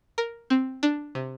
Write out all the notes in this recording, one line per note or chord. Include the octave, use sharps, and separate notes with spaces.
A#4
C4
D4
C3